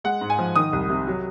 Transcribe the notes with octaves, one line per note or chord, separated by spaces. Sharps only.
G#3 F#5
G#2
G#5
F3
D#3 D#6
C2
C3
F#3